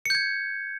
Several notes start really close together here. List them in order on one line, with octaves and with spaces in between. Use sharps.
C#7 G6 G#6